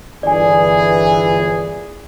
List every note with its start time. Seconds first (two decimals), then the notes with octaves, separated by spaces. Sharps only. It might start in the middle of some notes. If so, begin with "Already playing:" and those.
0.23 G1 E3 G#4 D5 G#5